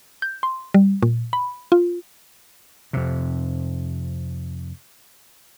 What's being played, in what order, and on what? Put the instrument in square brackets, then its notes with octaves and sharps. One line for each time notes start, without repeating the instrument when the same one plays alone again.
[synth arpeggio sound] G6
C6
G3
A#2
B5
F4
[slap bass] F2 C3